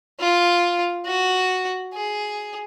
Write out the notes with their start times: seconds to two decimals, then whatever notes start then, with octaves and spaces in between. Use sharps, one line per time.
0.20 F4
1.06 F#4
1.94 G#4